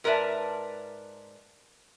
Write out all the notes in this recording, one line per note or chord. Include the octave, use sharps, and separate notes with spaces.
G#2 A#4 B4 D5 E5 A5